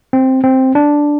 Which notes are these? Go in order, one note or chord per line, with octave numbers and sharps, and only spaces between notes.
C4
C4
D4